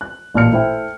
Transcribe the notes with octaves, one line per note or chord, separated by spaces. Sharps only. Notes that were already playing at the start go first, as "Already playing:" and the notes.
F#6
A1 A#2 A5 F6 C#7
A3 E4 C5 G5